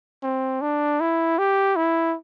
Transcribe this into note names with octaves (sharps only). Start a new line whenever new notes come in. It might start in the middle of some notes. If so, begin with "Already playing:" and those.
C4
D4
E4
G4
E4